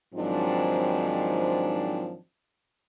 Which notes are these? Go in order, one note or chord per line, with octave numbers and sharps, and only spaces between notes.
G#2 D#3 F3 F#3 C4 D4